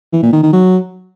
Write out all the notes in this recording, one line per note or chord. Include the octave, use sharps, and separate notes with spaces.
E3
A#2
D#3
D#3
F#3